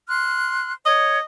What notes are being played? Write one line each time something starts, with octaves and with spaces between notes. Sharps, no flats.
C6 F6 F#6
C#5 D#5